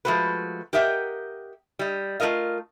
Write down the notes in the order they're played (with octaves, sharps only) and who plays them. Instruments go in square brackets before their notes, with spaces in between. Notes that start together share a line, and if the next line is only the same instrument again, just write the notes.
[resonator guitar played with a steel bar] F3 G#3 A3 F#4 B4
G4 A#4 D#5 E5 F#5 G5
G3 D#5
A3 F4 A#4 D#5 F5